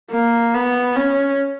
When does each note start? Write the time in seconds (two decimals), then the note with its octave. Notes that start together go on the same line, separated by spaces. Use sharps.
0.11 A#3
0.54 B3
0.96 C#4